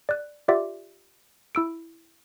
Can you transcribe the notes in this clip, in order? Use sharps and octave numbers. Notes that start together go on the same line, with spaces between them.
D5 F#6
F4 G4 D5 E5 F#5 D6
E4 E6 D7